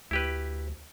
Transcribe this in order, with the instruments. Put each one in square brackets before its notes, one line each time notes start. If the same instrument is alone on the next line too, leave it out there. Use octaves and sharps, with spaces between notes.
[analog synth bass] D2 [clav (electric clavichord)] E4 G4 B4